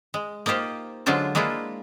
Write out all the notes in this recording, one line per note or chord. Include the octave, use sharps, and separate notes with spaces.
G#3
A#3 D#4 F4 G4 C5
D3 F#3 G#3 D4 F4 C5
G#3 A#3 D4 E4 F4